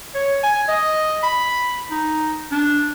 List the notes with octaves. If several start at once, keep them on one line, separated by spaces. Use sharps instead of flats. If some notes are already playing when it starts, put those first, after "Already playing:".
C#5
G#5
D#5
B5
D#4
D4